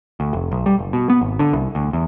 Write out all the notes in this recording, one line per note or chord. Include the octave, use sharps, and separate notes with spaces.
D2
F1
B1
G3
F#1
B2
B3
G#1
D3
C2
D2
E2